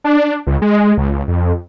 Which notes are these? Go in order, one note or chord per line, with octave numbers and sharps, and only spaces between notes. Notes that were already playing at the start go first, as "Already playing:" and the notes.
D4
C#2
G#3
C#2
F2